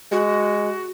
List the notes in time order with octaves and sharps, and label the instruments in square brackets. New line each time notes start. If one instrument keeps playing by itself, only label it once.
[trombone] G#3 [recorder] F#4